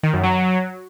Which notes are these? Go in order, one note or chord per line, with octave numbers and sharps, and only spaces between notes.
D#3
F#2
F#3